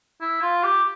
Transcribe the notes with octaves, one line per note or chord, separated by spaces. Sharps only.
E4
F4
G4